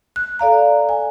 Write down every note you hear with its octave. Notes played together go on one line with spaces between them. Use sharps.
F#6
A4 D5 F5 A#5
G#5